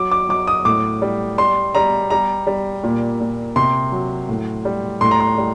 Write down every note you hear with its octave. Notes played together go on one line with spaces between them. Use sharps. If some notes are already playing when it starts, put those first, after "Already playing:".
Already playing: F#3 D6
D6
F#3 D6
D#6
A2 D6
G3
G3 C6
G3 A#5
G3 A#5
G3
A#2
A#2
C3 C6
F#3
A2
G3
A2 C6
A#5
C6
G3